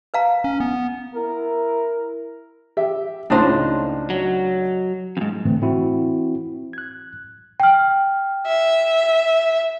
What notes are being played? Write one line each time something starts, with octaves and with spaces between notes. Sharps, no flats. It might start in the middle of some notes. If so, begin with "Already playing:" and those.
B4 F5 A#5
C#4
B3
E4 A#4
G4 E5
C#2 A2 C#3 D4 D#4 C5
F#3
F2 G#2
A2 D3 E3 A3 C4
E3 C4 E4 F#4
F#6 G#6
G5 F6
E5